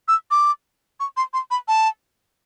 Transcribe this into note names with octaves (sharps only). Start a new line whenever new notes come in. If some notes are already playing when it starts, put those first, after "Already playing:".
E6
D6
C#6
C6
C6
B5
A5